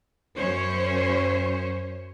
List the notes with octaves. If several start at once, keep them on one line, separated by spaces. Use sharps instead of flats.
F#2 C#4 C5 C#5